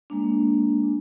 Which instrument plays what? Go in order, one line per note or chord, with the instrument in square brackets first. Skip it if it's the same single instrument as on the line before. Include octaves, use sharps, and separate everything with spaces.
[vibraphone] G#3 A#3 D4